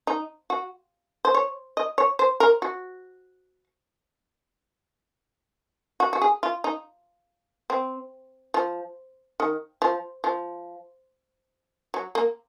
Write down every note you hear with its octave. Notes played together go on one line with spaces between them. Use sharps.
D#4
F#4
C5
C#5
D#5
C#5
C5
A#4
F#4
F#4
F#4
G#4
F4
D#4
C4
F3
D#3
F3
F3
F#3
A#3